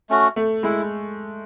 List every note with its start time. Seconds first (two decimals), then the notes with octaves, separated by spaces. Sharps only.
0.09 A3 C#4 F#4
0.36 A3
0.63 G#3 E4